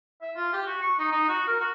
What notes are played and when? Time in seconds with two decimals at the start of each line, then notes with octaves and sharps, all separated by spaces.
0.22 E5
0.36 F4
0.53 G4
0.66 F#4
0.82 C#6
0.99 D#4
1.12 D#4
1.29 F#4
1.47 A#4
1.60 F#4